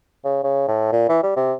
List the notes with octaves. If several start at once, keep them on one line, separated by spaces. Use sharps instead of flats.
C#3
C#3
A2
A#2
E3
G3
C3